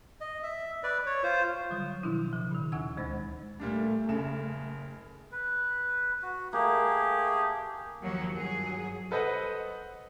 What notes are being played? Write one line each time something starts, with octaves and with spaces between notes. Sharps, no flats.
D#5
E5
B4 D5
C#5
F4 C5
D3 F#3 G3 D#6
B2 D#3 F3 D4 E4
C#3 F3
A#2 D#3
D#2 D#4 F#5 G#5 E6 G#6
D2 G#3 C5 B5 A6
A#2 G3 A3 D4
F#1 C#3 E7
B4
F#4
A3 A#3 G4 G#4
D#2 F3 F#3 A#3
G2 F#3 G#4
A4 B4 C5 D#5 F#5